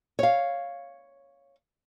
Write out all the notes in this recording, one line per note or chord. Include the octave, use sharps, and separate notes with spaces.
C#5 F5